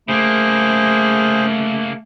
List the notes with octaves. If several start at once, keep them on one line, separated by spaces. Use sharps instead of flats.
C#3 A3 A#3 G#4 C5